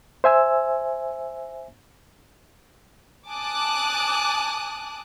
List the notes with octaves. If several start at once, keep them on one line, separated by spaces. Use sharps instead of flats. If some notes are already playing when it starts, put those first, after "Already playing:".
C5 E5 G#5 E6
G#5 A5 D6 D#6 F#6